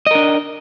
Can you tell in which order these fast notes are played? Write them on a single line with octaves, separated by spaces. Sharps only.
D#5 A#4 D4